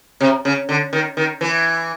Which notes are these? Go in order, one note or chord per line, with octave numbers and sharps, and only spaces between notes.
C3
C#3
D3
D#3
D#3
E3